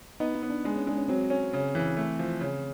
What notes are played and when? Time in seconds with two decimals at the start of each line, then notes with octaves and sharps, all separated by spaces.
0.20 B3 D#4
0.35 D#4
0.43 B3
0.50 D4
0.65 G#3 D4
0.76 C#4
0.87 G#3 D4
0.97 C#4
1.08 F#3 C4
1.30 C#4
1.53 C#3
1.75 E3
1.97 A3
2.19 F3
2.41 C#3